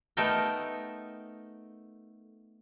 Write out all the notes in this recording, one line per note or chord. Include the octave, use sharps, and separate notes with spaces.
A3 B3 D#4 A4 A#4 G5